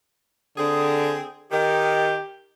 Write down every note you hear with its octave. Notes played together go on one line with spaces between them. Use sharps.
D3 C4 G#4
D#3 G4